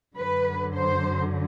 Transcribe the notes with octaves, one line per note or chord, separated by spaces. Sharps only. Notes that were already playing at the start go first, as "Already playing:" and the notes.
F#2 D3 F#3 B4
C5